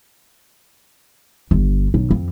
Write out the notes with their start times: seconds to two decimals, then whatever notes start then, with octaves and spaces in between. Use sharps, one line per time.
1.51 G1
1.94 B1
2.11 F2